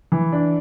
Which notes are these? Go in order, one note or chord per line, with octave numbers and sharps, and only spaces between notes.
E3
D4